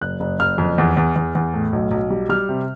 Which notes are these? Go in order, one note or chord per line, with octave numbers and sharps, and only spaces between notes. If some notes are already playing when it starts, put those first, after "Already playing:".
F#1 F#6
F#1
F#1 F6
F2
E2
E2
E2
E2
A2
B1
B1
G3
G3 F6
C3